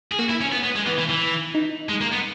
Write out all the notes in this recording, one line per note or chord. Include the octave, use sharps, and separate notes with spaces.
G#4
A#3 F#4
E4
C#4
B3
B3
G#3
E3 B3
E3
E3
D#4
G#3
A#3
B3